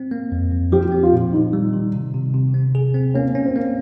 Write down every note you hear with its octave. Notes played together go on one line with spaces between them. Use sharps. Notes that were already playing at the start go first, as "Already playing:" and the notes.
Already playing: C4
A#3
F2
F2
F3 G4
C4
F4
A#2
D#3 D#4
G3
D#3
C3
C3
C3
C4
G#4
C4
A#3 C#4
C#4
C4
A#3